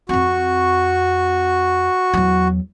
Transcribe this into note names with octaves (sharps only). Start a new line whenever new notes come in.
F2 C4 F#4 C#6
E2 F#3